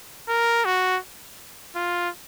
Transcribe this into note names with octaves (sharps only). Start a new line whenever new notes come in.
A#4
F#4
F4